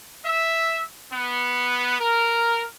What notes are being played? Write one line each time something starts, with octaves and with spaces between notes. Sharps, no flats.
E5
B3
A#4